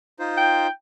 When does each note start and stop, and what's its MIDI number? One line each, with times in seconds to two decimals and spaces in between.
0.19 0.67 63
0.19 0.67 65
0.19 0.67 72
0.37 0.69 79